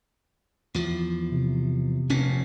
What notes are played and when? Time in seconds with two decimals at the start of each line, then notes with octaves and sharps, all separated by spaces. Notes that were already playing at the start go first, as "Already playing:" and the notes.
0.74 E2 F3
1.31 C3
2.10 F1 A#2 C#4